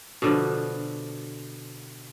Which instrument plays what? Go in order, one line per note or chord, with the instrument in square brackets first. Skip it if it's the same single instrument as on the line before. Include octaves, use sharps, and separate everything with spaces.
[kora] B2 D3 F3